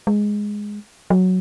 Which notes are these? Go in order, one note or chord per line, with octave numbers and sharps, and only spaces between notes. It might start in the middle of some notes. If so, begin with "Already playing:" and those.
G#3
F#3